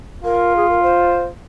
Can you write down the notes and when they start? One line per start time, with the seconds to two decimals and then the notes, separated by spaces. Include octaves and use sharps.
0.24 F4 A#4
0.56 G#4
0.70 A#4
0.83 C5